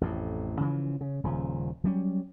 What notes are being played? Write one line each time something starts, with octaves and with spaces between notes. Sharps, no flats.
A1 F2 A2
C#3 E3 F3
C#3
D#1 C#3 F3
F#3 G3 C#4